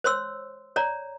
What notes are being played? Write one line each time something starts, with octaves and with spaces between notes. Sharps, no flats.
C5 C#5 C6 E6
C#5 D5 A#5